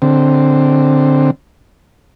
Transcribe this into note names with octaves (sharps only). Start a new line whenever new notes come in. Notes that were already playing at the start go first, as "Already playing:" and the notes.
D3 C4